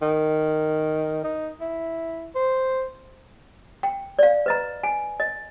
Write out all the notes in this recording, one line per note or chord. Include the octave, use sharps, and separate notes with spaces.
D#3
D#4
E4
C5
G5
D5 F5
B4 D#5 A#5
G#5
D#5